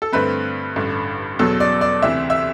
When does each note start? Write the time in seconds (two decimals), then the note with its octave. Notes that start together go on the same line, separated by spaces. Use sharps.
0.02 A4
0.13 G2 D3 A3 C4 B4
0.76 A1 G2 D3
1.39 E2 B2 F#3 A4
1.60 D5
1.81 D5
2.02 D2 C3 E3 E5
2.30 E5